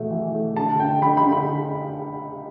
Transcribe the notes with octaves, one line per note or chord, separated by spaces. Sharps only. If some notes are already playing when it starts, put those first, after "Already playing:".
Already playing: B2 E3 A3
E3
A3
D3 A5
D3 G5
D3 B5
B5
D3
B5